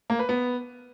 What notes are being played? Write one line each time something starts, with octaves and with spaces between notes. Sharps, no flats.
A#3
B4
B3